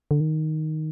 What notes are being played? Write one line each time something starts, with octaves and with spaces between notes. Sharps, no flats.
D3
D#3